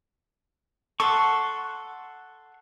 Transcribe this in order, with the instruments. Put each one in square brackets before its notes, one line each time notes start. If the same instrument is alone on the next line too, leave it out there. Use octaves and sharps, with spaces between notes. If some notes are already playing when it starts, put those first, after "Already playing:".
[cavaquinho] A4 [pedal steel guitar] F#5 C6 C#6